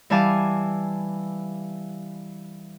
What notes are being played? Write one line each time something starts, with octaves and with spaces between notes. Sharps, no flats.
E3 G3 F5 G#5 A5 D6